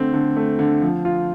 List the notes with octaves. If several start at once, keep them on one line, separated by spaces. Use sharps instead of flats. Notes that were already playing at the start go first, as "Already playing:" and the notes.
Already playing: D3 A3 C4
D3
A3
D3
F3
F4